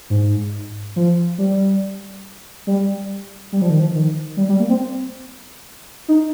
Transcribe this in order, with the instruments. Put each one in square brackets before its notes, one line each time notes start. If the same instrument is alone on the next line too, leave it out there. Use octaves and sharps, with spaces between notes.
[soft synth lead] G#2
F3
G3
G3
G3
F3
D#3
F3
D#3
G3
G3
A#3
C4
D#4